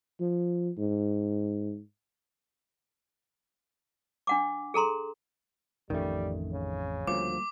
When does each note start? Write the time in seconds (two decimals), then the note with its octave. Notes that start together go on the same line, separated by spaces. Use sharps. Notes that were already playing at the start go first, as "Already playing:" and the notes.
0.20 F3
0.78 G#2
4.27 D4 F#5 D6
4.74 G#4 A4 A#5 C6
5.90 A1 F2 D#3 G3 A3 C#4
6.52 C#3
7.07 D2 F3 G3 G#3 A#3 D6